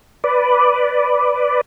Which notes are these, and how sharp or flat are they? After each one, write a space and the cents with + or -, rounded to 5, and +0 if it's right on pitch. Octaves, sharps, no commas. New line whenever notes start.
B4 +0 D5 +0